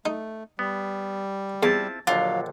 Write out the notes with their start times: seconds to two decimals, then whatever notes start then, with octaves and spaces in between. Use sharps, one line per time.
0.06 A3 D#4
0.59 G3 B3
1.63 E2 C4 E4 F4 A5
2.07 A#1 D#2 D3 F#3 F4